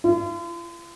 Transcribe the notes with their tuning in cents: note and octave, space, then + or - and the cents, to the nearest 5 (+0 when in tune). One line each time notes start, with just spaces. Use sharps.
F4 -45